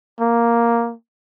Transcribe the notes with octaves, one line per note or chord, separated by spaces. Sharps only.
A#3